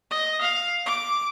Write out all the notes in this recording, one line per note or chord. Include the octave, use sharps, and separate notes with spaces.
D#5
F5
D6